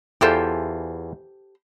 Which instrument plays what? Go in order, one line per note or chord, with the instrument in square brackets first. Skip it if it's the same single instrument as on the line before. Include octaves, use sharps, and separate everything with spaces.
[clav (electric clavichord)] E2 E3 F4 [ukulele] G4 A4 C5